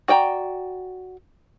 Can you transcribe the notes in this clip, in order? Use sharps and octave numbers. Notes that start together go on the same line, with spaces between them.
F#4 D5 G5 A#5